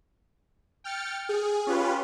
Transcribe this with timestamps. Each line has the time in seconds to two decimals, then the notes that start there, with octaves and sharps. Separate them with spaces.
0.84 G5 F6 A6 C#7
1.29 G#4
1.67 C#4 F4 G4 B4